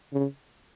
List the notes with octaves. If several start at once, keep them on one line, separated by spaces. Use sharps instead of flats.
C#3